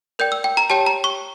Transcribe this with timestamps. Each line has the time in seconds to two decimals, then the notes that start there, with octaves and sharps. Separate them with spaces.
0.19 A#4 D5 G5 G6
0.32 E6
0.44 G5
0.57 A#5
0.70 G4 C#5 G5 A5
0.86 A#5
1.04 C#6